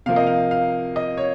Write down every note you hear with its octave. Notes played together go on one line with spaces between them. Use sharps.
C3 F3 A#3 F5
D#5
F5
F5
D#5
C#5